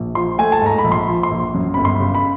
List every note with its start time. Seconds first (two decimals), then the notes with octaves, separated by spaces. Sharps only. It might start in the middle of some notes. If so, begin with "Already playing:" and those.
Already playing: A#1
0.15 F3 C6
0.38 A3 G#5
0.52 A5
0.62 G#2 A#5
0.78 B5
0.84 A#1
0.92 C6
1.08 F3
1.23 C6
1.31 A#1
1.54 F#2
1.74 G1 B5
1.85 C6
2.00 C#3
2.15 B5